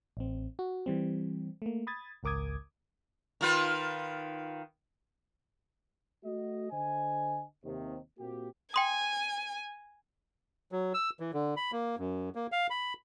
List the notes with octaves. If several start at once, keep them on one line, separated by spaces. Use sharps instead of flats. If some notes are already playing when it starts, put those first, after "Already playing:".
A1 C4
F#4
E3 G3 C4
A3 A#3
B5 D#6 G#6 A6
G#1 C#2 A#4 D6 D#6 G#6
D#3 F4 B4
A3 F#4 D#5
D3 C5 D#5 G#5
D#2 C3 D#3
A#2 A#3 C4 F#4 G4
G5 G#5 C6 D#6
F#3
E6
E3
D3
B5
A#3
F#2
A#3
F5
B5